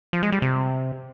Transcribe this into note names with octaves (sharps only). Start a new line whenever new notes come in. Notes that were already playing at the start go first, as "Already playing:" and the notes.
F3
G#3
G3
C3